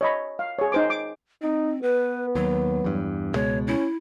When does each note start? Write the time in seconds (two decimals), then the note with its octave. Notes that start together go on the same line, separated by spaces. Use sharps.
0.01 C#5 D#5 B5
0.39 F5
0.59 G#4 C#5
0.72 D#4 C5 D6
0.90 D6
1.42 C4 D#4
1.83 B3 B4
2.35 D#2 F#3
2.84 E2 G2
3.34 C#2 B2 G#3 C#5
3.67 C#4 E4